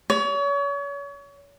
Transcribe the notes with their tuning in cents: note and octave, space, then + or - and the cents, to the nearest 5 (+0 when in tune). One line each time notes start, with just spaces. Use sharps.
C#5 +35